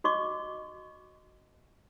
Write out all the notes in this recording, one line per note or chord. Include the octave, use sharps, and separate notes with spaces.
F#4 D#5 C#6 D6